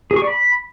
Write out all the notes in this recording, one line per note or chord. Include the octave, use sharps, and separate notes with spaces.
G#4
C#6
D5
B5